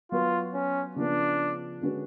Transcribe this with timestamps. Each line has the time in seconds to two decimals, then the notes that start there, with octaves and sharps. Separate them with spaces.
0.11 F#3 B3 F4 F#4 B4
0.54 C#4
0.96 C#3 F3 B3 D4
1.81 D3 G#3 C#4 F#4 B4